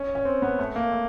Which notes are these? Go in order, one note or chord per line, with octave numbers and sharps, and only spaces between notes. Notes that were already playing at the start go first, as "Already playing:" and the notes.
Already playing: C#4
C#4
C4
B3
A3
A#3
A3